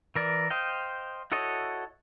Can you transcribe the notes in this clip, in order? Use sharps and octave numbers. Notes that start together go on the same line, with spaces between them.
E3 A#4 D5
C5 D#5 F5 G5
E4 F#4 A4 C#5 D#5